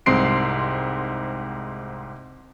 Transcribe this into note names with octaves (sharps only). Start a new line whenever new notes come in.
C2 G#2 C4 C6 C7 D7